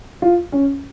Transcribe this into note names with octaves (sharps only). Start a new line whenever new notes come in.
F4
C#4